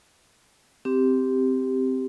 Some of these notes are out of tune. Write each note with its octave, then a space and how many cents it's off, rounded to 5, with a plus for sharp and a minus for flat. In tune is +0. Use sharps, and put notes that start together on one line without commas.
C4 -10 G4 +0